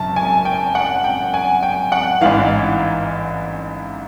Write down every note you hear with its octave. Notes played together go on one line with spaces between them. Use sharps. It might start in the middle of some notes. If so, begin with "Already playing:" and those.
Already playing: F#1 F#2 A5
G#5
G5
F#5
G5
G#5
G5
F#5
A1 G#2 E3 F5